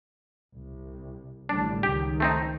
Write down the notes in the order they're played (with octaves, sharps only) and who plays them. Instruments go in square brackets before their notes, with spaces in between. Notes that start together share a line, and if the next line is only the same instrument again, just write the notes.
[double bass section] C2
[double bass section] A1 D3 G3 [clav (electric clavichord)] D4
[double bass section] C#2 D#3 [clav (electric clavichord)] G4
[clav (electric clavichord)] A3 C4 D#4